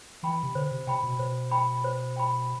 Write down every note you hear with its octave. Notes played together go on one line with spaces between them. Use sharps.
E3 G5 B5
C3
D3 C5
C3
C3 G5 B5
B2
B2 C5
G5 B5
C5
G5 B5